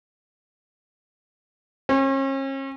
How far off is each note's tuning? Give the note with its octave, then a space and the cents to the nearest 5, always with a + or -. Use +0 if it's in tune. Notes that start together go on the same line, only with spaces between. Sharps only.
C#4 -40